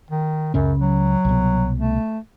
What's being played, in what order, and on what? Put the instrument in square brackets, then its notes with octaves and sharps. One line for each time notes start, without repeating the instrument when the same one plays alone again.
[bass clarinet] D#3
[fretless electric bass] C#2 C#3 C#4 [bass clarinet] F#2
[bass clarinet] F#3
[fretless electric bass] C2 B2
[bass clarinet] A3